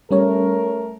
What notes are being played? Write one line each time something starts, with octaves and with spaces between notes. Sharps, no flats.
G3 A3 C#4 A#4 C#5